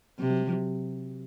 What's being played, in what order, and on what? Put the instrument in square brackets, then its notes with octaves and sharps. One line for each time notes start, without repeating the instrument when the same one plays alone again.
[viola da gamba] C3 [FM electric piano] F#3
[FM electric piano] F#3
G3
F3
F#3